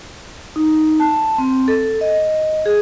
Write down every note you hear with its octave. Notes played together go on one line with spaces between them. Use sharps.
D#4
A5
C4
A4
D#5
G#4